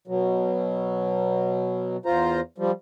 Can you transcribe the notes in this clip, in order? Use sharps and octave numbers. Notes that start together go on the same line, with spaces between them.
B2 F#3
E2 F4 C5 A#5
F3 G3